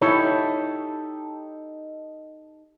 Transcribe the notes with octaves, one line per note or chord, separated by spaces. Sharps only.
D#4 E4 G4 A4 C#5